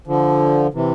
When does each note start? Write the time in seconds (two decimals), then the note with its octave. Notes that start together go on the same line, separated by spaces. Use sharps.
0.07 D3 F3
0.74 C3 E3